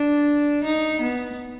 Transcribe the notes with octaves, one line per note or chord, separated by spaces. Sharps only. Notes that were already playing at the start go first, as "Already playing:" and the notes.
Already playing: D4
D#4
B3